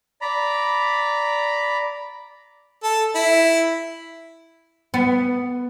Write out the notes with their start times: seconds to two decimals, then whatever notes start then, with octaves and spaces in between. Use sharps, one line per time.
0.21 D5 A#5 B5
2.83 A4
3.15 E4
4.94 B3